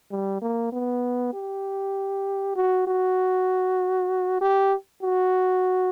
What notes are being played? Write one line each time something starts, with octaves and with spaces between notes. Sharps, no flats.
G3
A#3
B3
G4
F#4
F#4
G4
F#4